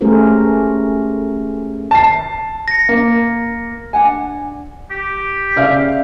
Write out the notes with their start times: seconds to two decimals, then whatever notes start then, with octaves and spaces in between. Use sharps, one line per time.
0.01 A3 C#4 G4 G#4 A#4 C5
1.91 A5 C7
2.68 A#6 C#7
2.89 A#3
3.93 D4 F#5 G#5
4.91 G4
5.56 C#3 D5 E5 F5 F6